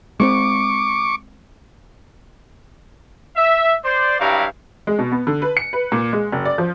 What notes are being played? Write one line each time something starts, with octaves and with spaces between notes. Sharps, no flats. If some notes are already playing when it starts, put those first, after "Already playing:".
G#3 B3 C4 C#6 D6
E5
C5 D5
G2 F#3 G3 E4 F5 A#5
G#3
B2
B3
D3
B4
C#7
B4
A#2
G#3
F#1
D5
F3